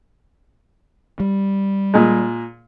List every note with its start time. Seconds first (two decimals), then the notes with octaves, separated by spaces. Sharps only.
1.20 G3
1.94 A#2 G#3